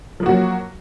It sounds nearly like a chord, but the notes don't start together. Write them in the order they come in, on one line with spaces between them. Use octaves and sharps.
F3 A#3 F#4 F#3